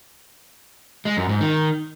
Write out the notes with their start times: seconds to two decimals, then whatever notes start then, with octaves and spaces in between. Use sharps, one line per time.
1.05 G#3
1.17 F#2
1.29 G#2
1.40 D#3